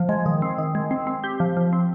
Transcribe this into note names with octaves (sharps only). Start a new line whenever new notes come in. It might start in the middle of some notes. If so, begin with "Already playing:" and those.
Already playing: F3
G#3
D#3
C4
D#3
G#3
C4
C4
G4
F3
F3
C4